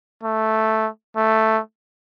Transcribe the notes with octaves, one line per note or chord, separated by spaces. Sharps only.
A3
A3